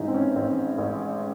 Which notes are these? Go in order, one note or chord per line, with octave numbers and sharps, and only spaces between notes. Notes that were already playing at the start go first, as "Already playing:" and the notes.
Already playing: A1 G#2 D#4 E4 G#4
C4
C#4
A1 C4
A1